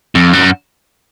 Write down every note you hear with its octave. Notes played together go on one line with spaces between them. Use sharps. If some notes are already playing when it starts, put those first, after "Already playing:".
F2
F#2